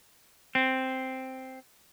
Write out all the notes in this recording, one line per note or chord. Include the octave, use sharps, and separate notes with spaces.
C4